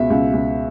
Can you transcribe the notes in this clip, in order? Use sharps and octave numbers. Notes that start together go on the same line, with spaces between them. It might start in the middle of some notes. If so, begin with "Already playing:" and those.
Already playing: C#2 B2 E5
C#2
C#2